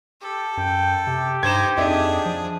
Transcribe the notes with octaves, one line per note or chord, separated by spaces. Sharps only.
G4 A4
F#2 G5
C3 G4
G2 D#4 C5 G#6 E7
F2 D4 D#4 G#4 D5 E5
F3